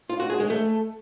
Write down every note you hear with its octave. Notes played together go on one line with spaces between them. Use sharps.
F4
F#4
G#4
G#3
A3